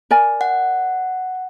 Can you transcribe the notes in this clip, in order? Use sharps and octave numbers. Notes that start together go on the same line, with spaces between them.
A#4 D5 G#5
F#5